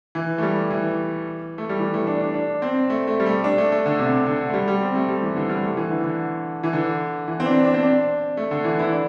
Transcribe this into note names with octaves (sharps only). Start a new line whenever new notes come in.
E3
A3
G3
E3
A3
G3
E3
A3
D4
D4
D4
C4
A3
A3
G3
A3
D4
A3
A3
D3
C3
D3
A3
G3
G3
C4
A3
G3
E3
D3
G3
A3
E3
D3
D3
E3
D3
E3
C4
D4
D4
C4
D4
A3
D3
E3
E4
D4